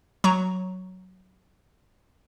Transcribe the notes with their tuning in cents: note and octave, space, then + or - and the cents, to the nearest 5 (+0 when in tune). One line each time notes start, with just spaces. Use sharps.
F#3 +0 A#5 +0 C#6 +0